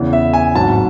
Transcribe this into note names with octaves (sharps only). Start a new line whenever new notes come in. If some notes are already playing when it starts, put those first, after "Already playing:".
Already playing: E2 C#3 E3
E5
G#5
A1 G#2 F#3 C4 A5